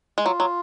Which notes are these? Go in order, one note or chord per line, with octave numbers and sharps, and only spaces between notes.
G#3
F#3 F4
F#3